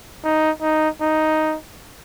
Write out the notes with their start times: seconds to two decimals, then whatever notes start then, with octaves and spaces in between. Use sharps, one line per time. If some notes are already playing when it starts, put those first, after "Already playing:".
0.24 D#4
0.61 D#4
1.01 D#4